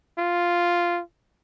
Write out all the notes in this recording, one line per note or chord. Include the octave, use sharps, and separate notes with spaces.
F4